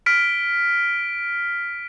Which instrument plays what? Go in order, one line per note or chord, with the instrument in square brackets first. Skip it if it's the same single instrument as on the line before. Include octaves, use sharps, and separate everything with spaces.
[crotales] F6 B6 D7